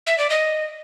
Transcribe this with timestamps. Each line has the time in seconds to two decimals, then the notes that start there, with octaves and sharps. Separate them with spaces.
0.07 E5
0.18 D5
0.30 D#5